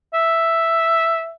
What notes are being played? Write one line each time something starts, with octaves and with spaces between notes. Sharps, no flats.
E5